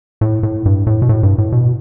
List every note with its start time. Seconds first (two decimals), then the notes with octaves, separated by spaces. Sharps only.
0.21 A2
0.43 A2
0.66 G2
0.87 A2
1.02 B2
1.09 A2
1.23 G2
1.38 A2
1.52 B2